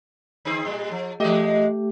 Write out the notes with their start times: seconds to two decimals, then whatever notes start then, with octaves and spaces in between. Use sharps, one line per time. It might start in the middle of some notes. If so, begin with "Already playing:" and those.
0.45 D3 C4 G#4
0.65 A2 G3
0.91 F3
1.20 E3 G#3 A3 G4 D#5